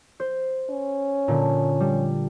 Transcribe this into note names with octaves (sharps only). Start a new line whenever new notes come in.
C5
C#4
A#2 D3
G3